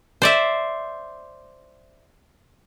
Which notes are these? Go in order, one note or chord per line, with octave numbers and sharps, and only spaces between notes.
C5 D5 E5